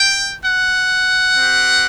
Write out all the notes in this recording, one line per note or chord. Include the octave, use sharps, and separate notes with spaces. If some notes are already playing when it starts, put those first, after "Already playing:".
Already playing: G5
F#5
C4 G4